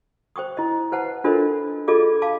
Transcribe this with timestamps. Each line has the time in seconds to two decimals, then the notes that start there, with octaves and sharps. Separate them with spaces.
0.36 C5 G5 C#6 D#6
0.57 E4 D#5
0.92 B4 C5 F#5 A5
1.24 D4 F4 A4 A#4 C5 D#5
1.88 F4 G#4 A4 D5 D#5 D6
2.22 F5 A5 D6